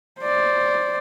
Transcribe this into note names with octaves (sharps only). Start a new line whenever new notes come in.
C5 D5